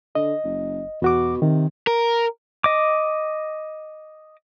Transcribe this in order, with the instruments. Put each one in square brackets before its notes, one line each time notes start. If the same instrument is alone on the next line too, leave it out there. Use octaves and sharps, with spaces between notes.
[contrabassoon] D3 [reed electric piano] D#5
[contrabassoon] F#1
[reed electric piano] E2 F#4 D6 [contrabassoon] B2
[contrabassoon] C3 [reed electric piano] D#3
[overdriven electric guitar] A#4
[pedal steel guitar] D#5 D6